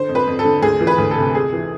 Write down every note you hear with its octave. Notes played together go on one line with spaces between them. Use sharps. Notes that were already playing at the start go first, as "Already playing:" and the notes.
Already playing: D3 C5
F2
B4
F2
A4
D3
D2 G#4
E3
B4
D2
A4
C3
F2 G#4
E3